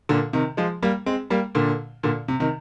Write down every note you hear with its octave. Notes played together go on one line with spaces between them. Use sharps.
A#2 D3
C3 D#3
F3 G#3
G3 A#3
G#3 C4
G3 A#3
A#2 D3
A#2 D3
C3
C3 D#3